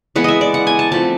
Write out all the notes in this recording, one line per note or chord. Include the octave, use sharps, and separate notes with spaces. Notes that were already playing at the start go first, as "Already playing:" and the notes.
E3 G#3 B3 F#5
D#5 E5
D5
F#5
G#5
A5
F3 A3 C4 A5